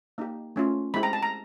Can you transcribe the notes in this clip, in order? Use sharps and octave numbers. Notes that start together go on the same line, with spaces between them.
A#3 D#4 G4
A3 C#4 F4
G#3 C4 E4 G4 B5
A#5
A5
A#5